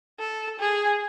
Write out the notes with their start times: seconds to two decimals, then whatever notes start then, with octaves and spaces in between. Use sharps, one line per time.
0.20 A4
0.60 G#4